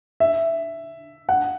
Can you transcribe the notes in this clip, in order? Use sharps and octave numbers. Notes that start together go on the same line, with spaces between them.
E5
F#5